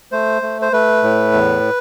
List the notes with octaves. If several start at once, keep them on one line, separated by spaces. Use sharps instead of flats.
A3 C5
A3
C5
A3 B4
A2
E2